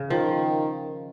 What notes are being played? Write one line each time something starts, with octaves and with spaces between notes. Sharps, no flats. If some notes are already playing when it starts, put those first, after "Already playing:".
Already playing: C#3
D#3 F3